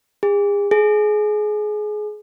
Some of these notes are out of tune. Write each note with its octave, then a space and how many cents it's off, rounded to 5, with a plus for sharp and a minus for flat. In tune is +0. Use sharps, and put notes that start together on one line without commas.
G#4 -40
G#4 +25